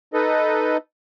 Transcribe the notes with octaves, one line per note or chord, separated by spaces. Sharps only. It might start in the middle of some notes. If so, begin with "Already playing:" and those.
D#4 A4 B4 D#5